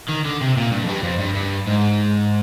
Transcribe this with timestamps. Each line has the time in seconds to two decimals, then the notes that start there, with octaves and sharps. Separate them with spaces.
0.08 D#3
0.25 D3
0.41 C3
0.57 A#2
0.72 G2
0.84 F2
0.88 G2
1.03 F2
1.19 G2
1.34 G2
1.67 G#2